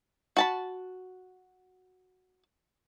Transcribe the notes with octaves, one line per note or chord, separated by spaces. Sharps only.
F#4 A5 B5